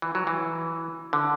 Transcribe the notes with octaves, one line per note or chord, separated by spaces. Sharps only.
E3
F#3
E3
D3